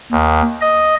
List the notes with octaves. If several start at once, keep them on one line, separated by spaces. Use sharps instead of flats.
D#2
D#5